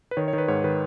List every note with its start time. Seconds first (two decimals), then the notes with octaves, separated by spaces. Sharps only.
0.11 B4
0.17 D#3 C#5
0.28 C#5
0.33 D#3 B4
0.48 G#2 C#5
0.64 D#3 B4